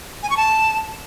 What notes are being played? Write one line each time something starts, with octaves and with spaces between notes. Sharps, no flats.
G#5
C#6
A5